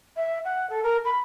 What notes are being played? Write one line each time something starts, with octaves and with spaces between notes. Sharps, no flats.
E5
F#5
A4
A#4
B5